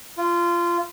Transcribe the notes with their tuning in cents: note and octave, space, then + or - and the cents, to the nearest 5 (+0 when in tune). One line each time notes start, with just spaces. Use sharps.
F4 -20